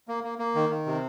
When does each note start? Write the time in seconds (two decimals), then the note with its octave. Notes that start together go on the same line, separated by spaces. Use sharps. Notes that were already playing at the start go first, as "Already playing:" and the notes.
0.08 A#3
0.24 A#3
0.38 A#3
0.55 D#3
0.69 D#3
0.86 C3